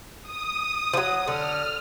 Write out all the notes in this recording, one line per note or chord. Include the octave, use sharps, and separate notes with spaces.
D#6
F3 F#3
D3 F6